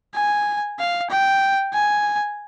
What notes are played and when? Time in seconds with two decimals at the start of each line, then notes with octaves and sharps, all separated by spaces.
0.14 G#5
0.79 F5
1.10 G5
1.74 G#5